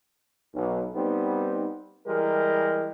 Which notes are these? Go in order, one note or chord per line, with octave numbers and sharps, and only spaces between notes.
B1
G3 B3 C4 D#4
E3 G3 G#3 G4 A#4